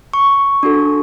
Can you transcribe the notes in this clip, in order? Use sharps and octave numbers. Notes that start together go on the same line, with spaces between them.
C#6
D4 F#4 A4